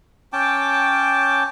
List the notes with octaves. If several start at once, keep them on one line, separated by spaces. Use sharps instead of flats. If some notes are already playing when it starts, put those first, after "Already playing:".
C#4 G5 A5 D6